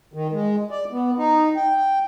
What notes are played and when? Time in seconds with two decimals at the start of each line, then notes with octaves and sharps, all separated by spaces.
0.14 D#3
0.33 G#3
0.71 D5
0.92 B3
1.18 D#4
1.56 G5